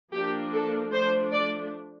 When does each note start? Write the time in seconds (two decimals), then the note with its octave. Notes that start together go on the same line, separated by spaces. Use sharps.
0.14 F3 A#3 D4 G4
0.54 A4
0.92 F3 A3 D4 C5
1.32 D5